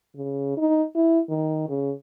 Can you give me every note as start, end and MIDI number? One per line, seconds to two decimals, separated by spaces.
0.15 0.53 49
0.57 0.84 63
0.95 1.20 64
1.30 1.68 51
1.69 1.91 49